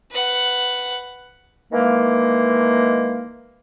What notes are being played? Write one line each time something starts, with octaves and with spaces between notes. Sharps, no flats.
B4 F#5
D#3 E3 G#3 A#3